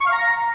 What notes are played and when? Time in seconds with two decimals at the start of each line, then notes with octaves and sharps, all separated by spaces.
0.01 C#6
0.06 F5
0.12 A#5